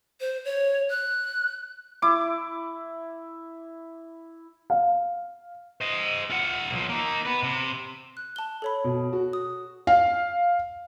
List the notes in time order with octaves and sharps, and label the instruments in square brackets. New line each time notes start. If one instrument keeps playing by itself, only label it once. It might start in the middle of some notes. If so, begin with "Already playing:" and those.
[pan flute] C5
C#5
F#6
[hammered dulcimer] E4 D6
[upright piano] F5
[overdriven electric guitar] C5 D#5
F4 F#5
B1 F3
A#3 D#4
B3 B4
C3
[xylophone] F#6
A5 G7
A4 C#5 B5
[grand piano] B2
F#4
[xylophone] D#6
[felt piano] F5